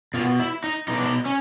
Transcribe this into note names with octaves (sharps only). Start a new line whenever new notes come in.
B2 F4
E4
D#4
B2 D#4
D4
D#4
C#4